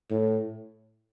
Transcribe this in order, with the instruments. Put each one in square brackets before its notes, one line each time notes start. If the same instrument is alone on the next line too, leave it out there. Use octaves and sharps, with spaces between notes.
[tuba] A2